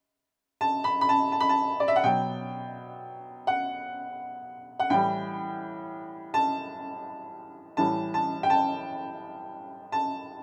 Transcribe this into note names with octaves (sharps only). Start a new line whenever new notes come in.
A5
B5
B5
A5
A5
B5
A5
D5
E5
F#5
B2 F#3 G5
F#5
F#5
A2 E3 G3 G5
A5
A2 E3 G3 A5
A5
G5
A5
A5